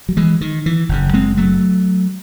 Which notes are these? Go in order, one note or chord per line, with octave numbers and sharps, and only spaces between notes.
F#3
E3 G#3
D#3
E3
F#1 F#2 C#3
G#3 C4
F#3 A3